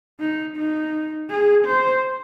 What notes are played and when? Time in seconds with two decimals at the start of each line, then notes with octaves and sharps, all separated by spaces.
0.20 D#4
0.57 D#4
1.29 G#4
1.66 C5